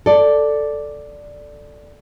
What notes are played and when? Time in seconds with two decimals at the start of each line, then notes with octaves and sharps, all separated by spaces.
0.06 A4 D5